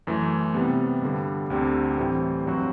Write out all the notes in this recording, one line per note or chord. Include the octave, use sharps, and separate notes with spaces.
F#2 E3 A3
C3 G3 B3
G2 D3 G3
D2 D3 G3 C4 G4
A2 E3 G3 C4
G2 F#3 C4 F#4